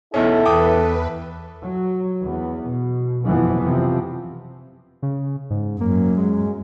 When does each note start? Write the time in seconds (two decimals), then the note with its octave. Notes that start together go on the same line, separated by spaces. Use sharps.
0.14 B1 E2 C#4 E4 A4
0.45 E2 B4 G5 D6 D#6
1.60 F#3
2.24 E2 B3
2.71 B2
3.26 F#1 F2 B2 E3 F3 B3
3.63 C3 F3
5.02 C#3
5.50 G#2
5.81 F#2 A#3
6.17 G#3